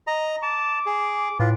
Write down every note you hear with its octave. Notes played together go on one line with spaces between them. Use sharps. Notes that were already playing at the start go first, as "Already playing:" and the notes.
D#5 A#5
A5 D6
G#4
A2 F4 B4